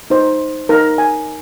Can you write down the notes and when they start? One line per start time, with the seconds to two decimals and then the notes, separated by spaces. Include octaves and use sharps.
0.10 D#4 C5
0.69 D#4 A#4 A#5
0.98 G#5